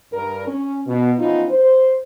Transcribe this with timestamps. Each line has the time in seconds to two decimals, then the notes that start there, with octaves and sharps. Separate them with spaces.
0.13 G2 A#4
0.47 C#4
0.87 B2
1.19 E3 F3 B3 C#4 D#4 F4
1.50 C5